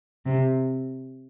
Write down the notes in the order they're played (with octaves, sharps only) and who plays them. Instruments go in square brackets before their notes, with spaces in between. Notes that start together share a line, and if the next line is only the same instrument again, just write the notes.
[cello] C3